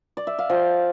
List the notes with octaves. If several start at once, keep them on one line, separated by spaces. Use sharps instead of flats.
D5
E5
F5
F3 G5